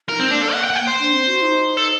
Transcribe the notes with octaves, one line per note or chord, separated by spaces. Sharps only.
D#4 F#4 A#4
C4
A#3 D4
A4
F#5
G5
F#5
G5
C5
D4
C4
F#4
D#4
A4